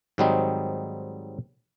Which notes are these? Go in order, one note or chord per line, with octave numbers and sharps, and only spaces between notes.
G#2 D#3 F#3 G3 C4 D#4